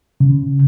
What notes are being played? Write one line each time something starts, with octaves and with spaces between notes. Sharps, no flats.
C#3